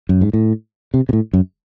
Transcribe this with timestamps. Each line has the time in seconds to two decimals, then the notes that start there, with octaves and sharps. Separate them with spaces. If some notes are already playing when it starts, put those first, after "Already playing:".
0.09 F#2
0.21 G#2
0.33 A2
0.94 C3
1.09 C3
1.13 A2
1.33 F#2